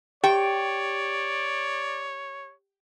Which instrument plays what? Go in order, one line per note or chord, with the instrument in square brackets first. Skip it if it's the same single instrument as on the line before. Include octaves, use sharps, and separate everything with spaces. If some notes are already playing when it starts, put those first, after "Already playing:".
[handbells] G4 [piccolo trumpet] C#5 [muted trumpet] D5 [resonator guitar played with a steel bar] G5